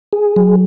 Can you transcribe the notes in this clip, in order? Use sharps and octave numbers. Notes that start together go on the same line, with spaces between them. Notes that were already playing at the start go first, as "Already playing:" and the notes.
G#4
F#3